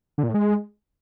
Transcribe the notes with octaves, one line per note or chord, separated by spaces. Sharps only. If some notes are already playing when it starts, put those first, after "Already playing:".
D3
A#2
A2
G#3